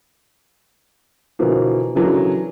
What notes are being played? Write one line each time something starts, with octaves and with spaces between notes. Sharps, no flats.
B2 D3 E3 F3 A#3
C#3 E3 F#3 D4 A4 A#4